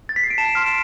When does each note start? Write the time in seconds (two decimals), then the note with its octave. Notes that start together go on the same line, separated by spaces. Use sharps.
0.09 A6
0.16 B6
0.24 C7
0.30 D7
0.38 A5 E7
0.55 C6 F6 D7
0.66 E7